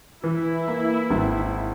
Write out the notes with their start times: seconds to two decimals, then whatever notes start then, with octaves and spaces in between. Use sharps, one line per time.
0.24 E3 E4
0.68 A#3
1.10 G#1